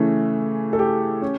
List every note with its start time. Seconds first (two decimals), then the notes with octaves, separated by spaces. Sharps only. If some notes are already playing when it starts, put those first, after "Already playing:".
Already playing: C#3 E3 A3 C#4
0.73 A4
0.79 G4
1.22 C#4